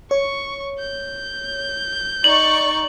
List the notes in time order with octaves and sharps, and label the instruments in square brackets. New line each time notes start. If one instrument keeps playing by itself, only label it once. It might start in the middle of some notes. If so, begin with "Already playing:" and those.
[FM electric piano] C#5 [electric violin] C#6
[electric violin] G6
[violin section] D#4 D5 C#6 [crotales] F#7